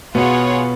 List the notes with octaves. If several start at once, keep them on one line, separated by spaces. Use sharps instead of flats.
B2 B3 F4 G#4 C#5 F#5